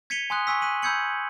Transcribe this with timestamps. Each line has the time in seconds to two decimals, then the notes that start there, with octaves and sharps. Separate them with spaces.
0.10 G#6 B6 C#7 D#7 F7 G7
0.30 G#5 C6 D#6 F#6 G7
0.47 G#5 C#6 E6 B6
0.62 F#6 B6 D#7 F#7
0.82 B5 E6 G6 G#6 C#7 F#7